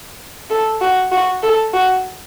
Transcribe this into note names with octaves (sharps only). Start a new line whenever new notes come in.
A4
F#4
F#4
A4
F#4